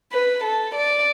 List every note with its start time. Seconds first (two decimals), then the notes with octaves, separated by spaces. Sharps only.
0.12 B4
0.43 A4
0.75 D5